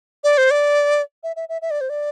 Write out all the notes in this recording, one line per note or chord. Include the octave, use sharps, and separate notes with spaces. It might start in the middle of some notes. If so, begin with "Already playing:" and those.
D5
C5
D5
E5
E5
E5
E5
D5
C5
D5